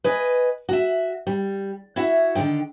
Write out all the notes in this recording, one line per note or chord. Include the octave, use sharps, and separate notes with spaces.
B4 D#5 G#5
F#4 E5
G3
E4 F#4 E5 F#5
D3 D#3 E4 G5